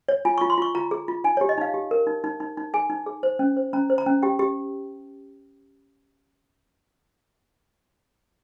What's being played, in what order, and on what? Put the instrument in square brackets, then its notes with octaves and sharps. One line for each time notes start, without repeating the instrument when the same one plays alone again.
[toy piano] C#5
F4 G#5
F4 C#6
C6
F4 C#6
F4 A#5
G#4
F4
D#4 G#5
C#5
G4
D#5
D#4 F5
G4
A#4
D#4
D#4
D#4
D#4
G#4 G#5
D#4
G#4
C5
C#4
C5
C#4 A#5
C5
A#5
C#4
G4 G5
G4